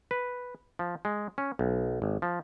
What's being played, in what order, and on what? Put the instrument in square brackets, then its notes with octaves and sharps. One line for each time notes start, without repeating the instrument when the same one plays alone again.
[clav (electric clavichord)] B4
F3
G#3
C#4
B1
G#1
F3